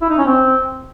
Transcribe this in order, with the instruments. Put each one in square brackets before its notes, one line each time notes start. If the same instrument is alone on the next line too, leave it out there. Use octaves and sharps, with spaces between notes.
[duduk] E4
D#4
C#4
C4